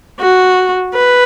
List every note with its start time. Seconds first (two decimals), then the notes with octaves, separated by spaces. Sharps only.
0.20 F#4
0.95 B4